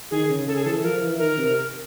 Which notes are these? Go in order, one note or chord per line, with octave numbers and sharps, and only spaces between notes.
D#3 G#4
C#3
C#3 A4
G#4
E3 A4
F3 A#4
E3
D#3 A#4
C3